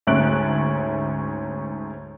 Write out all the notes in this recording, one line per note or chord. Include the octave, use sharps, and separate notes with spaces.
D2 G#2 A3 C#4 F#6 D7